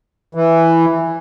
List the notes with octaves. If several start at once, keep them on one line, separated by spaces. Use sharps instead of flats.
E3